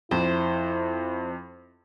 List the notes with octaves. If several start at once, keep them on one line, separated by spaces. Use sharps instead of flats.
F2 E4 C5